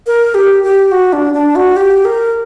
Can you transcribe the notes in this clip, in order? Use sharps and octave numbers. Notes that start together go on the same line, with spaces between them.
A#4
G4
G4
F#4
D4
D4
F#4
G4
A#4